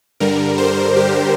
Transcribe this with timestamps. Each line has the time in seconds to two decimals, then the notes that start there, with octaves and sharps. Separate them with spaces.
0.20 G2 D3 G3 A#4
0.58 C5
0.96 G4